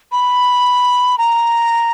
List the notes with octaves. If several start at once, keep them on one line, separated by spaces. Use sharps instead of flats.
B5
A#5